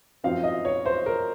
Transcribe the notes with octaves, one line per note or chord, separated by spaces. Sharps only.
F#2 F3 C4 D#4 F5
D#5
C#5
C5
A#4